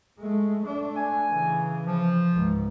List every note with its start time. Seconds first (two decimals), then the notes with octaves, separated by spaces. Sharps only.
0.19 G#3 A3
0.63 A3 D4
0.97 G#5
1.32 C#3 E3
1.86 F3
2.32 C#2 G#2